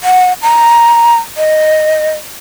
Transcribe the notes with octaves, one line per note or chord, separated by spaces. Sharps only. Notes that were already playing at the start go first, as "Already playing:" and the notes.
F#5
A#5
D#5